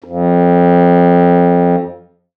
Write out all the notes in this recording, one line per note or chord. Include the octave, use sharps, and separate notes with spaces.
F2